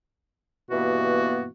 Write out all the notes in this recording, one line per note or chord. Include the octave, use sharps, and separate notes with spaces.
G2 B2 E3 A#3 B3 F#4